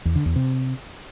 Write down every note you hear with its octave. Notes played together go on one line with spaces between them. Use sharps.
E2
D3
E2
C3